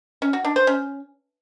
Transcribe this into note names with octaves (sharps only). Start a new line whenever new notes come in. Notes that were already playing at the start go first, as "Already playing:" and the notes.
C#4
F#4
D4
C5
C#4